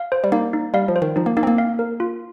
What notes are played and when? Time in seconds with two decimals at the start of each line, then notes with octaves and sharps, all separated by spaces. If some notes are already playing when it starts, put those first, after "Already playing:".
Already playing: F5
0.12 C5
0.24 G3
0.32 A#3 D#4
0.53 D#4
0.74 G3 F5
0.88 F3
0.96 C5
1.02 D#3
1.16 F3 D#4
1.26 A#3
1.37 A#3 D#4
1.43 C4
1.47 A#3
1.58 F5
1.79 A#4
2.00 F4